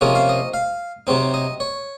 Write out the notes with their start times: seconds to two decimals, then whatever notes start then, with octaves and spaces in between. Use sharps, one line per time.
0.01 C3 F3 A#3 C#4 D#5
0.15 F5
0.29 D#5
0.54 F5
1.07 C3 F#3 C4 D#4
1.34 D#5
1.60 C#5